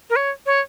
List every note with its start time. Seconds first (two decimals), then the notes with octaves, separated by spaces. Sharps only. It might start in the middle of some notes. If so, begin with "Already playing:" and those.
0.10 A#4
0.16 C#5
0.46 C#5